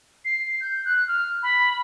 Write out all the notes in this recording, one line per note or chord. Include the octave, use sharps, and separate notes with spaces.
C7
G6
F#6
F6
B5